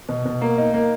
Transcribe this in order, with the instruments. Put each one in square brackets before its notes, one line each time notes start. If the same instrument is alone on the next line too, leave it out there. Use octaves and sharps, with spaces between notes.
[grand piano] B2
B2
A#3
D#4
A#3